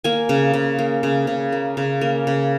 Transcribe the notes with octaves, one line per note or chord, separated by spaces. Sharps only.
A#3 G#5
C#3
C#3
A#3
C#3
C#3
A#3
C#3
A#3
C#3